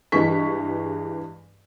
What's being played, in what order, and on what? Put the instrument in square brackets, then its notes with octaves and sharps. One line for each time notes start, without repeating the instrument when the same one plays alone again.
[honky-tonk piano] G2 E3 G#3 C#6 B6